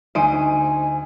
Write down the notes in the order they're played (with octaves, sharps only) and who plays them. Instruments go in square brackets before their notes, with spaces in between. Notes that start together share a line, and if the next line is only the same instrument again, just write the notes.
[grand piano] D2 D7 D#7 [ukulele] D#4 C5 [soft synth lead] G#5